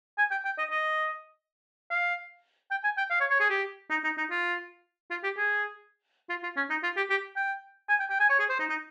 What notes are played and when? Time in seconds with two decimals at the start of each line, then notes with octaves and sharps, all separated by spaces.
0.18 G#5
0.31 G5
0.45 G5
0.58 D#5
0.71 D#5
1.91 F5
2.71 G5
2.84 G#5
2.98 G5
3.11 F5
3.21 C#5
3.31 C#5
3.40 G#4
3.50 G4
3.90 D#4
4.04 D#4
4.18 D#4
4.31 F4
5.11 F4
5.24 G4
5.37 G#4
6.30 F4
6.43 F4
6.57 C#4
6.70 D#4
6.84 F4
6.97 G4
7.10 G4
7.37 G5
7.89 G#5
8.00 G5
8.10 G5
8.20 G#5
8.30 C#5
8.40 G#4
8.50 C5
8.60 D#4
8.70 D#4